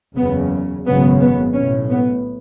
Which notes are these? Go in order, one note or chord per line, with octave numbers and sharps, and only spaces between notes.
F#1 E2 C#3 B3
G#1 F#2 C#3 B3
B3
B1 A2 C#4
B3